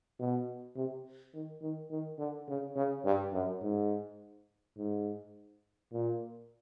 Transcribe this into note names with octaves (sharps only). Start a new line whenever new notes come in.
B2
C3
D#3
D#3
D#3
D3
C#3
C#3
G2
F#2
G#2
G#2
A#2